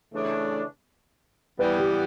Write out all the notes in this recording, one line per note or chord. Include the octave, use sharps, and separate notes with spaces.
C#3 E3 A3 D4
E3 G3 B3 B4
G4